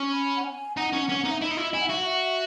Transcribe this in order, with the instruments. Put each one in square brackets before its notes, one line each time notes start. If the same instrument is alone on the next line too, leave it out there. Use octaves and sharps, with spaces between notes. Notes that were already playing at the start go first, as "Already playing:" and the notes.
Already playing: [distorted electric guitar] C#4
[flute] B5
F#5
G#5
[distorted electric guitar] D#4 [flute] F#5
[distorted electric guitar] C#4
C#4
[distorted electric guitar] D#4 [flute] F#5
[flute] E5
[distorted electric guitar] E4 [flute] D#5
[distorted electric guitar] D#4
E4
[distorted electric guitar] E4 [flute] G#5
[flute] F#5
[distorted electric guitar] F#4 [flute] E5
[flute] F#5
E5